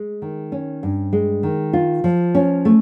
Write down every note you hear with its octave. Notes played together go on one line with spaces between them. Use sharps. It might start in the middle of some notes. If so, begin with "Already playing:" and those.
Already playing: G#3
D#3
C#4
G2
G#3
D#3
F4
F3
C#4
A3